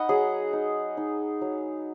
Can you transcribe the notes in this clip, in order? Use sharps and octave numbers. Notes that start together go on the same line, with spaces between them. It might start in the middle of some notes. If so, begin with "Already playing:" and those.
Already playing: D#4 D#5 F#5 B5
F#3 G#4
D#4
D#4
F#3